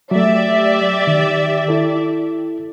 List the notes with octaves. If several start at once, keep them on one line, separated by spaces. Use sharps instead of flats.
F#3 A3 G4 D5 E5
D#3
E4 A4